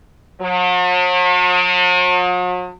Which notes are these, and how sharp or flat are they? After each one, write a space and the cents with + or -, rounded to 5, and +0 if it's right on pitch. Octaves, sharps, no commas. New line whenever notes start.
F#3 -45